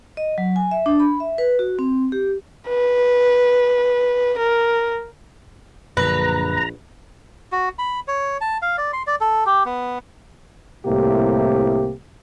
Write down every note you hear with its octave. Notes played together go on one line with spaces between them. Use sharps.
D#5
F#3
G#5
E5
D4
B5
E5
B4
F#4
C4
G4
B4
A#4
A#1 F#2 D3 B4 A#5
F#4
B5
C#5
A5
F5
D5
C6
D5
A4
G4
B3
C2 A2 C3 A#3 G4